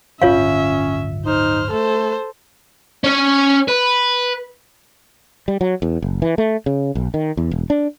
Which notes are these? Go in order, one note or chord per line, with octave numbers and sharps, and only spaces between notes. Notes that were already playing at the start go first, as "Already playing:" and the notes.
D1 G1 D3 C#4 F4 C#5 E5 F5
D#4 C5 F6
A3 A4 C5
C#4 C#5
B4
G3
F#3
E2
F#1
E3
A3
C#3
B1
D#3
E2
E1
D4